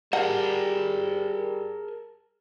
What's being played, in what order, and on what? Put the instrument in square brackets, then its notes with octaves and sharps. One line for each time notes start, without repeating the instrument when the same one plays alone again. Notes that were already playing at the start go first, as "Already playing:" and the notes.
[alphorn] G3 [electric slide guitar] G#4 A#4 A5 [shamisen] F#5